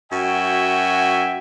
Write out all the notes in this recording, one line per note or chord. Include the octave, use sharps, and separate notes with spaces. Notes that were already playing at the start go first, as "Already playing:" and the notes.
F#2 F#4 E5 G5 G#5